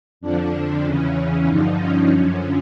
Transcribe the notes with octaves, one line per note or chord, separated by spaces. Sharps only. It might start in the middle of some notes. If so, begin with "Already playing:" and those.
F2 D3 F3 D4
E2 C#3 E3 C#4
G2 D3 F3 D#4
C#4
F#2 D3 F3